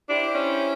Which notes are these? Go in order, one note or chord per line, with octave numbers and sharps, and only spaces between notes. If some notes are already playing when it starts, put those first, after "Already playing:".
D4 E4 G4 C5
C#4